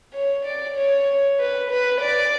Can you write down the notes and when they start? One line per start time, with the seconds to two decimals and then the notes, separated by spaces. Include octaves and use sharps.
0.13 C#5
0.45 D5
0.76 C#5
1.38 B4
1.69 B4
2.00 D5